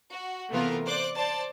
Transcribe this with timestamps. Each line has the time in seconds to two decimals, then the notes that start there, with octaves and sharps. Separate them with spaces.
0.10 F#4
0.49 C3 E3 A3 B3 F4 A#4
0.86 C5 D5 D6 F#6
1.16 C5 D5 A5